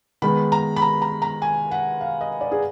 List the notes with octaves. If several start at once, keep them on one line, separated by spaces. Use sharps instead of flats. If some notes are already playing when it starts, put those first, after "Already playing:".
D#3 G#3 B3 B5
A#5
B5
A#5
A#5
A#5
G#5
F#5
F5
D#5
D5
G#4